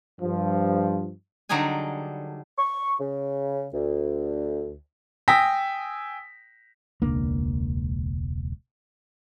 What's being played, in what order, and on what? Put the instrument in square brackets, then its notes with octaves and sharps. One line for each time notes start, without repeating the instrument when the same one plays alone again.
[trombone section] G2 F3
[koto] D3 F#3 G3 D#4 G#4 G#5
[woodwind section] C#6
C#3
D2
[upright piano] G5 G#5 D#6 E6 A#6 B6
[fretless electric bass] E1 C#2 A#3 D4